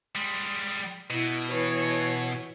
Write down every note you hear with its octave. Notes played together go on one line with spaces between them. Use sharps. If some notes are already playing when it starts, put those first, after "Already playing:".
G3 G#3
B2 E4
E3 C#5